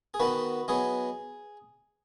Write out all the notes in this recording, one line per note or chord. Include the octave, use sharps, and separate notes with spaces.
G#4
D#3 B3 D#4 F#4 B4
F#3 B3 D#4 G#4